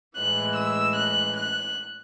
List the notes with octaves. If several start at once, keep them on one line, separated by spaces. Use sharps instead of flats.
A2 E3 G#3 F#6
E6
F#6
F#6